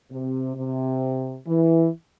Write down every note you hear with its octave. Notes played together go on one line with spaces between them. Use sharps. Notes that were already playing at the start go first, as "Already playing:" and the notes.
C3
C3
E3